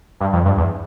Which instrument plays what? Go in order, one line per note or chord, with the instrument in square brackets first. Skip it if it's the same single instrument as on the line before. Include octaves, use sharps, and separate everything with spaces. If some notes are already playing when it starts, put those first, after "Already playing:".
[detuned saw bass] G2
F2
G2
E2